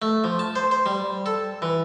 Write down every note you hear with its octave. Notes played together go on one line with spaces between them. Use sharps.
A3
F3
A5
C5
C5
G3
A4
E3